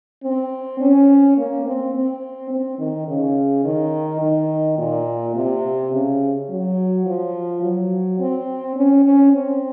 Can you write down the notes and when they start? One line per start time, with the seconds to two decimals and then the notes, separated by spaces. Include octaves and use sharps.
0.23 C4
0.81 C#4
1.38 A#3
1.66 C4
1.94 C4
2.50 C4
2.79 D#3
3.08 C#3
3.64 D#3
4.22 D#3
4.78 A#2
5.36 C3
5.93 C#3
6.49 F#3
7.06 F3
7.62 F#3
8.19 C4
8.76 C#4
9.05 C#4
9.33 C4